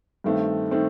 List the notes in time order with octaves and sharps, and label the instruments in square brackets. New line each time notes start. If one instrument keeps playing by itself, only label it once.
[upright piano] G2 D#3 A3 C4
D#3 A3 C4